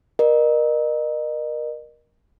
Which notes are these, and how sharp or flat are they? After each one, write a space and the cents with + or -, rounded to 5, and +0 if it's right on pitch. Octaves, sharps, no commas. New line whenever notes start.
A#4 +25 D#5 -35